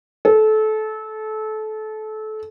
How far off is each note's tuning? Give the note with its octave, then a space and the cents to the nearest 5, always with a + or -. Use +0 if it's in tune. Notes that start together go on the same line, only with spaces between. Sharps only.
A4 -25